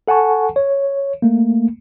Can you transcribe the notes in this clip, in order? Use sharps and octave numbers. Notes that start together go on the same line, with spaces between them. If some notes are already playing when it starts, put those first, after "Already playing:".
A4 F#5 G#5 A5 C#6
C#5
A3 A#3